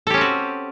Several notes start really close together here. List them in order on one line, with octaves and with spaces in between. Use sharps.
A4 G4 C#4 C4 F#4